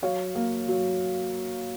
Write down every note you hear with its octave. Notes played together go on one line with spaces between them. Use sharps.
F#3 C#5 F5
A#3
F#3